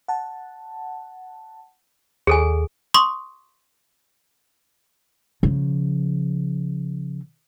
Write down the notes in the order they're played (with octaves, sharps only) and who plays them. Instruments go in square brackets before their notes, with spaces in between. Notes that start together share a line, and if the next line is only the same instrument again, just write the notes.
[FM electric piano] F#5 A5
[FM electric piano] D#2 [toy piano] G#4 A4 G#5
[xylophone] C6 C#6 D#6
[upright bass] C#3 F3